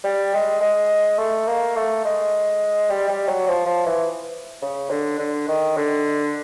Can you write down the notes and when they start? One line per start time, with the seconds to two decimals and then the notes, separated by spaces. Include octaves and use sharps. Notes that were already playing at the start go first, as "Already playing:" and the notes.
0.04 G3
0.33 G#3
0.61 G#3
1.18 A3
1.47 A#3
1.76 A3
2.05 G#3
2.90 G3
3.09 G3
3.28 F#3
3.48 F3
3.66 F3
3.86 E3
4.62 C#3
4.90 D3
5.19 D3
5.48 D#3
5.77 D3